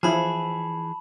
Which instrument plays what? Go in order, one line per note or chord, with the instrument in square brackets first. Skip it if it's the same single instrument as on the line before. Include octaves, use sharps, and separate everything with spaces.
[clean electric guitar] E3 G#4 [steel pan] F3 E4 [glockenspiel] A5 B5